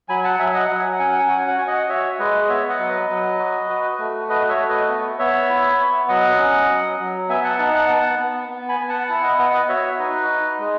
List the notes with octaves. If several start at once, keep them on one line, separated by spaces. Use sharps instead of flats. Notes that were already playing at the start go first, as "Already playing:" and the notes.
F#3 G#5 B5
F#5 A5
F#3 E5 G#5
D#5 F#5
F#3 F#5
G#5
F#5
C#4 G#5
F#5
G#5
F#4 F#5
G#5
F#5
F#4 G#5
D#5 F#5
F#4 C#5 E5
G#3 B4 D#5
B3 C#5 E5
D#5 F#5
F#3
B4 D#5
F#3
F#4
F#4
A3
F#4 B4 D#5
C#5 E5
A3
B4 D#5
B3
B3 C#5 E5
E4
B3
F#3 D#5 F#5
C#4
F#3
F#3
B3 E5 G#5
F#5 A5
D#4 F#5 A5
F#5 A5
B3 F#5 A5
B3
B3
G#5 B5
B3
F#5 A5
E4 F#5 A5
D#5 F#5
B3 D#5 F#5
B4 D#5
F#4 C#5 E5
D#4 B4 D#5
D#4
G#3